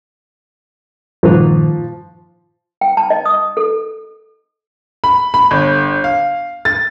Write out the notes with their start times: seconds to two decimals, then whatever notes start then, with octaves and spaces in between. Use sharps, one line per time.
1.23 G2 A#2 D#3 F3
2.81 G5
2.97 A5
3.10 D#5
3.25 D#6
3.57 A4
5.04 B5
5.34 B5
5.51 G1
6.04 F5
6.65 A6